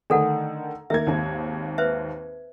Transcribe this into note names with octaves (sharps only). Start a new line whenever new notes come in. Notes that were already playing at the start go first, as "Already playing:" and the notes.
D3 D#3 A3 D4 A4 F#5
D#3 A#3 E5 G#6
G#1 D#2
B4 C5 E5